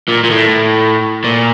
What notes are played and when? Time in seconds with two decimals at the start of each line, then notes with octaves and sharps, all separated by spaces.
0.08 A#2
0.24 A#2
0.31 A2
1.24 A#2